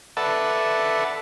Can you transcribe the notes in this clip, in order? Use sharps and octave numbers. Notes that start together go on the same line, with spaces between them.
A4 B4 D5 E5 F#5 A5